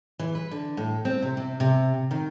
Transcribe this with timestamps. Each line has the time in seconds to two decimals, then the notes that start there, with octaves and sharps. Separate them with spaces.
0.19 E3
0.35 B4
0.51 D3
0.77 A2
1.05 C4
1.22 C3
1.37 C3
1.60 C3
2.11 D#3